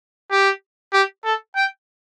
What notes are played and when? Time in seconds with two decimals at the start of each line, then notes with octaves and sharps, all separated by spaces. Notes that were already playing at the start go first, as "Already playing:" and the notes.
0.31 G4
0.93 G4
1.25 A4
1.56 G5